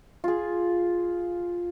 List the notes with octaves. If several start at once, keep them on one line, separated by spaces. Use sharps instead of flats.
F4 G#4